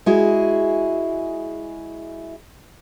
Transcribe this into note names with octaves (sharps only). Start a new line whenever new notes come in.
G#3 E4 F#4 G#4